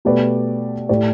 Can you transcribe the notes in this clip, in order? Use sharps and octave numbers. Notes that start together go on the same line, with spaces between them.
B2 A3 G4 B4 D5
A2 A3 G4 D5